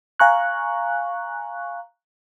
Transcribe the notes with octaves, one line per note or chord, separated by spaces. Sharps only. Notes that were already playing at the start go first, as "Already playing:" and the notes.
F5 G#5 A#5 C#6 F#6